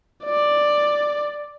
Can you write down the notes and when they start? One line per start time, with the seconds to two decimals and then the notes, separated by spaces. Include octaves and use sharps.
0.25 D5